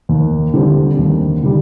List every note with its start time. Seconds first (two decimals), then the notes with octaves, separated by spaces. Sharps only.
0.09 D#2
0.54 D3 G3 C4
0.99 D#2
1.43 D3 G3